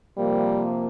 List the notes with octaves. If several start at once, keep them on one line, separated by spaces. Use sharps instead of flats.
C3 F3 G3 A#3